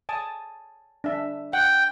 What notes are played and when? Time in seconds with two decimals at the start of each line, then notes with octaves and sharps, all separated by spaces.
0.09 G#5 A5 D#6
1.04 D4 E5
1.53 F#5 G5